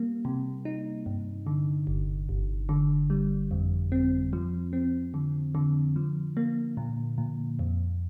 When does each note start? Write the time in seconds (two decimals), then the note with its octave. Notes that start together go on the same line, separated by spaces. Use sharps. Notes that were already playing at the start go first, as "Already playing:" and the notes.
Already playing: G3 A#3
0.25 C3
0.65 D#4
1.06 G2
1.47 D3
1.87 G1
2.29 G1
2.69 D3
3.10 G3
3.51 F2
3.92 C4
4.33 F3
4.73 C4
5.14 D3
5.55 D3
5.96 F3
6.37 A#3
6.77 A#2
7.18 A#2
7.59 F2